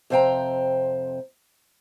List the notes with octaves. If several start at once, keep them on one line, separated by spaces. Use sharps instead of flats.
F2 C3 C5 F5 G5 A#5